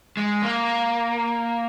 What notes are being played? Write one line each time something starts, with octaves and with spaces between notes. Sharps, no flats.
G#3
A#3